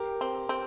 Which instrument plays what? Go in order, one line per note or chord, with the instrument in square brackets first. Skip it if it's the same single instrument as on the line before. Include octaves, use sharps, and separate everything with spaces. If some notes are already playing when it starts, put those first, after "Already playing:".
Already playing: [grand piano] G4 A#4
[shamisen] C4
C4